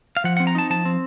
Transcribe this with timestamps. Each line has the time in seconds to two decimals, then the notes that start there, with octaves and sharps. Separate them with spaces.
0.17 F5
0.24 F3 F#5
0.37 C4 F#5
0.47 A#5
0.55 D#4 A5
0.70 F3 A5
0.85 C4